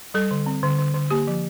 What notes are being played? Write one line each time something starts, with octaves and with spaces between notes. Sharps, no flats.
G3 A4
D3
C4
D3
D3
D3
A#3 G4
F3